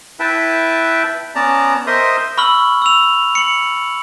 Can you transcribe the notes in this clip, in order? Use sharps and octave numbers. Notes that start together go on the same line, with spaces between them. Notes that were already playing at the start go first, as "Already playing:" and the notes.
E4 B4 E5 G5 A5
B3 C#4 D5 A5 A#5
A#4 C5 D#5 E5 C6 D#6
B5 C#6 E6 F6 F#7
E6 F7
C#7 F#7